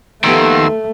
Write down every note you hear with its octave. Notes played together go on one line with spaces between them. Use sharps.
D#2 D#3 F3 A3 B3 G4 C6 E6